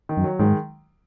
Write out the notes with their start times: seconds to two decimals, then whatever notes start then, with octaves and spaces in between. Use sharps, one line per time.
0.09 D#3
0.17 F#2
0.24 F#3
0.39 G#2 D#3 G#3